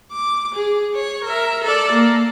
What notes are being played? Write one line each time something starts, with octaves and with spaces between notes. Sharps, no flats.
D6
G#4
C#5
A#4 E5
A4 D5
A#3